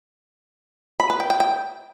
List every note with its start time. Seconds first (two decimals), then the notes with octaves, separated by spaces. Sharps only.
1.00 B5
1.10 B4
1.20 G5
1.30 G5
1.40 G5